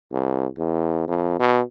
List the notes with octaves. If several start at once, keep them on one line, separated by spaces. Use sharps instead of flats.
C2
E2
F2
B2